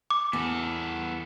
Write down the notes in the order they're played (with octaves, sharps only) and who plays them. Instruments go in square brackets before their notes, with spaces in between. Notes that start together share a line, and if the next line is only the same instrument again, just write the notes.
[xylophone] D6
[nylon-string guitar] E2 [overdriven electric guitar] B3 A4